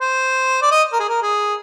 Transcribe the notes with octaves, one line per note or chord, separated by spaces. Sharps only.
C5
D5
D#5
A#4
G#4
A#4
G#4